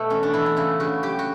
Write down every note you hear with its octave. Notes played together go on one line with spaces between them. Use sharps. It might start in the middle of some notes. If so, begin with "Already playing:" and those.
Already playing: B2 A3 B3
E3 C#4
D4
E3 E4
E4
C#3 E4
C#3 F#4
F#3 G4
F#4